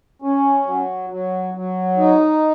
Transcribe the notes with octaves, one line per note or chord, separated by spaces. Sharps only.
C#4
F#3
F#3
F#3
D#4